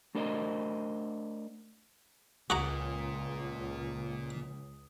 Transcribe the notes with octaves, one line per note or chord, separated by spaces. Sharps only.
A3 D4 A#4 C5 D#5
C#2 A#2 F#4 F#5 A#5 D#6